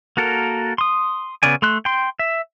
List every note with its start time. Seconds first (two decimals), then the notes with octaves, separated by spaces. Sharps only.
0.17 A#3 F#4 A4 A#4
0.78 C6 D#6
1.43 C#3 B3 C#4 D5 G#5
1.62 A3 C6 F#6
1.85 G5 C6
2.19 E5